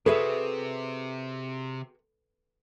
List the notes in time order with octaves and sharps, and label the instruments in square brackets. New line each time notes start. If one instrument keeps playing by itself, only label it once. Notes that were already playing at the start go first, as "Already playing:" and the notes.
[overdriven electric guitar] C3 [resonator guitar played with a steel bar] F#4 G#4 E5 [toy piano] A4 [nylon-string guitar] B4